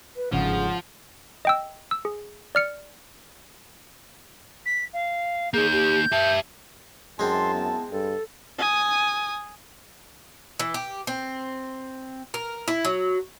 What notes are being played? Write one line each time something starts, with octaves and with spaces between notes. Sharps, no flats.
B4
G1 G#2 C#3 F3 F#5
D#5 G5 E6
E6
G#4
D5 F6 C#7
B6
F5
A#3 D#4 G#4 G6
G4
G4 E5 A5
F#2 G#3 C4 E4 A5 C6
B3
G2 A4
G#5 D#6
E3
G4
C4
A#4
E4
F#3